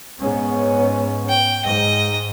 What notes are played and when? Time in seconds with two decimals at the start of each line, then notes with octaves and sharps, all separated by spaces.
0.19 G#2 B3 C#4
1.29 G5
1.65 G#2 D#5